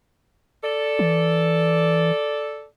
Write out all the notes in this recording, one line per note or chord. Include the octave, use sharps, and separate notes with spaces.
A4 D5
E3